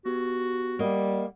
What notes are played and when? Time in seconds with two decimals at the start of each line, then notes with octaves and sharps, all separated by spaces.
0.06 B3 F#4 G4
0.79 G3 A#3 D#5 F#5